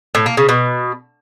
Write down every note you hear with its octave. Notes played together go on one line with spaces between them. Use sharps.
A2
A#3
C#3
B2